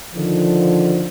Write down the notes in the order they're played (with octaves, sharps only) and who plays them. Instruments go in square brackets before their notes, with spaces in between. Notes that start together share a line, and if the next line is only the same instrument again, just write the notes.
[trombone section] D3 D#3 F3